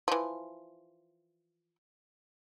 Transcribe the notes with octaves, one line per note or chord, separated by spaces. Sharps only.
E3 F3